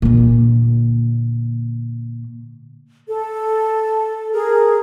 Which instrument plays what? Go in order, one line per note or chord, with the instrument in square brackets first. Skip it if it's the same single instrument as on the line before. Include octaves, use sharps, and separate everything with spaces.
[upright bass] A#2 D3
[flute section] A4
G#4 A#4